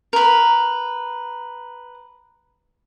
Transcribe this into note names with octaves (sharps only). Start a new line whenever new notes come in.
A#4 B4